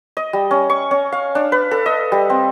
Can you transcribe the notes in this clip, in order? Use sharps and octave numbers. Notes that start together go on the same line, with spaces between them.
D#5
G3
C#4
C#6
C#4
F5
D4
B4
A4
D#5
G3
C4